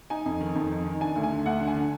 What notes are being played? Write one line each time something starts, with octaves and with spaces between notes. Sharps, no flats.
D#4 G#5
F2
D#3
F2
D#4
D#3
D4 G#5
D2
G#5
D3
D2 F#5
D3
G#5
D3